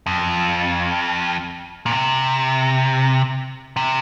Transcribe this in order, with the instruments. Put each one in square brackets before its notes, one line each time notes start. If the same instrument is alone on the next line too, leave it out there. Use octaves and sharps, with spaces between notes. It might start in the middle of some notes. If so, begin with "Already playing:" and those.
[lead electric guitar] F2
A#2
C3
C3